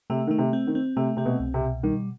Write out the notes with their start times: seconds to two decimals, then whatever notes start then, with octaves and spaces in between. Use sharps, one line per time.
0.10 C3 A3
0.27 D#3 A3
0.38 C3
0.53 C4
0.67 D#3
0.75 C4
0.96 C3 A3
1.17 C3 C4
1.25 B2
1.40 C2
1.54 C3
1.61 B2
1.83 D#3 G3